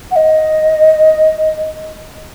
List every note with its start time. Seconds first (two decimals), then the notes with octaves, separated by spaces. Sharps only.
0.11 F#5
0.16 D#5